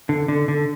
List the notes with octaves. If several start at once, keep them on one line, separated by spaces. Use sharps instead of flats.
D3
D3
D3